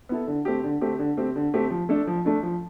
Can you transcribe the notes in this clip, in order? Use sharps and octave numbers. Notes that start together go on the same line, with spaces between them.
B3 E4 A4
D3
A3 C4 G4
D3
A3 C4 G4
D3
A3 C4 G4
D3
A3 C4 G4
F3
A3 D4 A4
F3
A3 D4 A4
F3